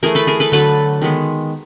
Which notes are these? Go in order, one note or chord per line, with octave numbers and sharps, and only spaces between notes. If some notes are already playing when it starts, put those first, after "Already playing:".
E3 A3 G#4 A#4
A4 B4
G#4 A#4
A4 B4
D3 F#3 A3 A4 B4
D#3 G#3 B3